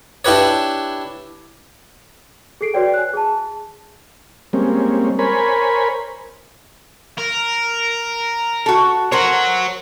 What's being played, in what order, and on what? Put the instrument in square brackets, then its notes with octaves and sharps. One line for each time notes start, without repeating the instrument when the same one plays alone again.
[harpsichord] D4 E4 G4 B4 C#5
[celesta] G#4 A4 C7 D7
F#4 B4 C#5 D5 G5
G#5 F#6
G#4 A5
[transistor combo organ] G3 G#3 A#3 C4 C#4
A#4 C5 C#5 G#5 B5
[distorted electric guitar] A#4
[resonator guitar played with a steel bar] F#4 A4
[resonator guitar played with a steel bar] A#4 C5 [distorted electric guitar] C#5 F#5